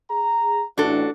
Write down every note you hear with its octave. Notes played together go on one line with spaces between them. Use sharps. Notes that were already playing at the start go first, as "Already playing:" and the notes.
G#4 A#5
A1 D4 F#4 A4